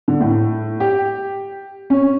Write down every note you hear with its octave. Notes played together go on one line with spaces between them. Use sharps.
D3
A2
G4
C#4